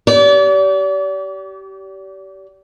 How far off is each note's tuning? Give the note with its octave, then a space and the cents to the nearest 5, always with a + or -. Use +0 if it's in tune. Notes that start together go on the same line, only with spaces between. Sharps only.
G4 -25 D5 -40